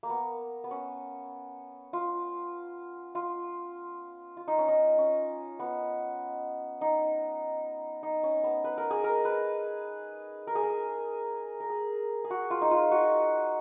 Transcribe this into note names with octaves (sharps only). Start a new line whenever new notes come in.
A#3
B3
B3
C#4
F4
F4
F4
D#4
C#4
D#4
C#4
B3
D#4
D#4
C#4
B3
B4
A#4
G#4
A#4
B4
A#4
G#4
A#4
A#4
G#4
G#4
F#4
F4
D#4
F4
F#4